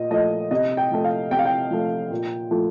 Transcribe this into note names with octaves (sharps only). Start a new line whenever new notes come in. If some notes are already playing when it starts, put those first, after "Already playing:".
Already playing: A#2 D#5
F3 A3 D#5
C3 D#5
G5
F3 A3
F5
C3 G5
F5
G5
F3 A3
A#2
F3 A3